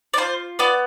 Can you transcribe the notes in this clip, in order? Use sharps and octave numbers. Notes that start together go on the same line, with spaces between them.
D5
F4 C5
B3 D5